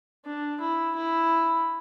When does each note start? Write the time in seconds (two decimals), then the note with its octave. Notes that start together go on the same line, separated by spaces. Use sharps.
0.26 D4
0.60 E4
0.95 E4